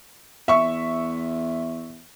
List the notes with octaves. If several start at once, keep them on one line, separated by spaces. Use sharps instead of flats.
E2 E5 C#6